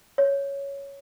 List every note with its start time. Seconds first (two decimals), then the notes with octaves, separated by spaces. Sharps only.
0.18 C#5